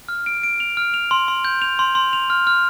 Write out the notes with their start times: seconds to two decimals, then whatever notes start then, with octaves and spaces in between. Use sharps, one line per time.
0.09 F6
0.26 D7
0.43 D7
0.60 F7
0.77 F6
0.94 F7
1.11 C6
1.28 C6
1.45 G6
1.62 F7
1.79 C6
1.95 C6
2.13 F7
2.30 F6
2.47 F6